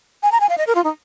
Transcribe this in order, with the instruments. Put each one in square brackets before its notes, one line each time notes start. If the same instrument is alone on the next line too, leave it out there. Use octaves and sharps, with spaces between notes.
[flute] G#5
A#5
G#5
F5
D#5
A#4
F4
D#4